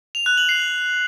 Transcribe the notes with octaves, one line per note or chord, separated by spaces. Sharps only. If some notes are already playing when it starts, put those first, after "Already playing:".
F7
F#6
F#7
C7